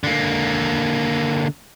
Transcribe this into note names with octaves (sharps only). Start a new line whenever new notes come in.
D3 A#3